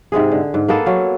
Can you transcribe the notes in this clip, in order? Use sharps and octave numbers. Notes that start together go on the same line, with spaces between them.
G#2 C3 G#3 G#4
D3
G#2
A#3 B3 G#4 A4
F#3 F5